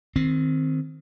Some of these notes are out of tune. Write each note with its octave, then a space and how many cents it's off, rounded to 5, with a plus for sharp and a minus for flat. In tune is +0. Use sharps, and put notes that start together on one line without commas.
D#3 +0 C4 +0